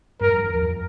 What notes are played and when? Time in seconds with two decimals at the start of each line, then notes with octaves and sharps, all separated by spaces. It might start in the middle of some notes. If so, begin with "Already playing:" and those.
0.21 G2 A#4
0.33 F2
0.43 E2
0.55 F2